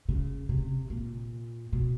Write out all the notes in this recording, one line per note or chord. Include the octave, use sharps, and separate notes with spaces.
C#3
C3
A#2
B2